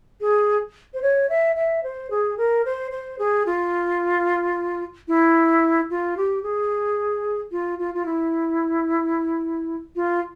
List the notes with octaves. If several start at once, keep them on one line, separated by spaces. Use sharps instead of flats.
G#4
C5
C#5
E5
E5
C5
G#4
A#4
C5
C5
G#4
F4
E4
F4
G4
G#4
F4
F4
F4
E4
F4